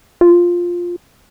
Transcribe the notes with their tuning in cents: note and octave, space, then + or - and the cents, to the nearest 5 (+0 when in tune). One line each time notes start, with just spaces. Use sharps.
F4 +5